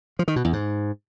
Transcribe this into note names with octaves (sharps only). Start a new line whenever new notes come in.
F3
D#3
B2
E2
G#2